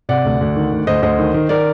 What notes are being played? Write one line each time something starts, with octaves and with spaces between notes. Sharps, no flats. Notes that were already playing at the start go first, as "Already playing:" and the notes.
C3 D5 F#5
D2
D2
D#3
D2
D2 C5 D#5
D2 C5 D#5
D#3
D#3
D#3 A#4 D5